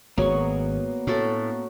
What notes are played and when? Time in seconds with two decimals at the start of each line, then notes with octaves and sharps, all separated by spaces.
0.18 G#1 F#3 A#3 B3 G#4 C#6
1.07 A2 C#4 F#4 A4